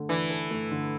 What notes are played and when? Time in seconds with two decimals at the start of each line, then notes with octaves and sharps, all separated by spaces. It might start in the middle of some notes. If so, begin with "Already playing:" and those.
Already playing: D3 A3
0.09 E3 D4
0.30 A4
0.51 A3
0.71 D3